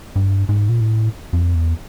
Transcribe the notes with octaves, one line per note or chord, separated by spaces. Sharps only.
G2
G#2
A#2
A2
F2
E2